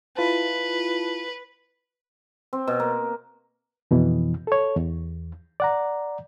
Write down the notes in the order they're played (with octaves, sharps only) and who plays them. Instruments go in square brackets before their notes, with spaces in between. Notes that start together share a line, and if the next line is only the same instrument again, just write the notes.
[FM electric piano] E4 F4 A5 [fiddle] B4
[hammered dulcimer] C4
B2
A#3
[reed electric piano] F2 B2 E3
A4 C#5
E2
D5 F#5 A#5